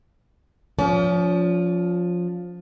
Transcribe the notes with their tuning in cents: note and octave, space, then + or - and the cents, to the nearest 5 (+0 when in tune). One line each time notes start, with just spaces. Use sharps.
F3 +15 C#4 +45